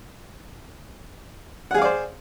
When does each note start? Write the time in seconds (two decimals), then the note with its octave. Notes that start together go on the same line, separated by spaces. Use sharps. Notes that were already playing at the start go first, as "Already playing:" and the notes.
1.71 F#5
1.74 G#4
1.78 F5
1.82 D5
1.85 C5